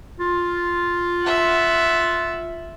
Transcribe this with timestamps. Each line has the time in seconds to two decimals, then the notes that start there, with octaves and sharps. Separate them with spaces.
0.20 F4
1.22 E5 F#5